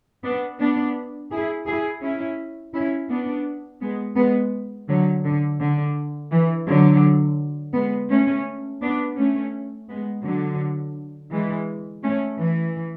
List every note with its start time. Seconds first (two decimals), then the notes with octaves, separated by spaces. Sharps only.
0.24 B3 D4
0.60 B3 D4
1.31 E4 G#4
1.67 E4 G#4
2.02 C#4 E4
2.74 C#4 E4
3.09 B3 D4
3.80 G#3 B3
4.17 G#3 B3
4.89 D3 F#3
5.24 D3
5.60 D3
6.31 E3
6.66 D3 F#3
7.74 G#3 B3
8.10 A3 C#4
8.81 B3 D4
9.17 A3 C#4
9.88 G#3 B3
10.24 D3 F#3
11.31 E3 G#3
12.03 A3 C#4
12.38 E3